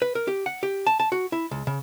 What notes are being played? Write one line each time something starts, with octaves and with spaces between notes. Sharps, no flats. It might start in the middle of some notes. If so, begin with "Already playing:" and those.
B4
A#4
G4
F#5
G4
A5
A5
F#4
E4
C#2
C#3